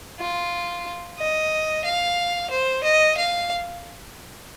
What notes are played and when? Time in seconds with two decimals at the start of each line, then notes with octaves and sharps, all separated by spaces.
0.20 F4
1.19 D#5
1.85 F5
2.50 C5
2.84 D#5
3.17 F5